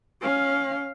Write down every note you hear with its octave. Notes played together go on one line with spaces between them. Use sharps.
C#4 F5